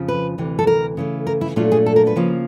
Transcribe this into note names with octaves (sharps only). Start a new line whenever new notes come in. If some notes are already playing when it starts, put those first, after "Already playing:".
Already playing: F2 C#3 F3
B4
D2 C3 E3
A4
A#4
C#3 E3 A3
A#4
E4
A#2 F#3 A3 D4 F4
G#4
A4
A#4
B4
C#3 F3 A#3